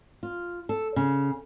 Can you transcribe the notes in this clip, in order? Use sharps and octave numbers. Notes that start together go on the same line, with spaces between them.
F4
A4
C#3